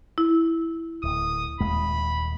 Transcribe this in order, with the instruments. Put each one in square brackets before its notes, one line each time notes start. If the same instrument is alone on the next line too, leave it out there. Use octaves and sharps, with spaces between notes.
[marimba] E4
[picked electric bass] D1 [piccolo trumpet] D#6
[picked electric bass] D#1 D#2 G#3 [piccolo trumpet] B5